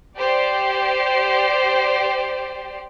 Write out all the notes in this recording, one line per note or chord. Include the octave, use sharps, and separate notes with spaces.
G4 C5 D5